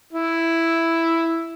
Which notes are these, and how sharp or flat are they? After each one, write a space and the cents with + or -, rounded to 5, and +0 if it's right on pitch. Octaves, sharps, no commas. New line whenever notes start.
E4 +0